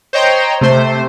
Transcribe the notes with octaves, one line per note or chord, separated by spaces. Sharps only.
C5 C#5 D#5 G5 A#5 C6
C3 A3 C5